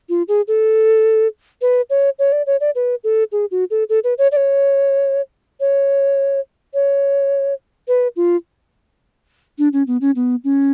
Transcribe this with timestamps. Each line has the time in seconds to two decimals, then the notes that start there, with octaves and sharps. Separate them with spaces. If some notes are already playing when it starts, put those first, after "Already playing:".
0.09 F4
0.28 G#4
0.48 A4
1.62 B4
1.90 C#5
2.19 C#5
2.32 D5
2.47 C#5
2.60 D5
2.75 B4
3.04 A4
3.32 G#4
3.51 F#4
3.71 A4
3.89 A4
4.04 B4
4.18 C#5
4.32 D5
4.37 C#5
5.60 C#5
6.74 C#5
7.88 B4
8.16 F4
9.58 D4
9.73 C#4
9.87 B3
10.01 C#4
10.16 B3
10.44 C#4